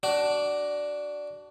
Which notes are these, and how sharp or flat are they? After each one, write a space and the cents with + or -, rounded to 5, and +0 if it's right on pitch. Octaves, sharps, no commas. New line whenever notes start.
D4 +0 F#4 +25